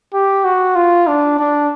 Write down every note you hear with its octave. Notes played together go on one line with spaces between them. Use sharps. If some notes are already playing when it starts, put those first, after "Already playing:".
G4
F#4
F4
D4
D4